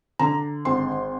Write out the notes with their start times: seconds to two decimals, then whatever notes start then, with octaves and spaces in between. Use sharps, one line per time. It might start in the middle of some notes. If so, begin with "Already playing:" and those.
0.19 D3 A#5
0.65 G#1 C6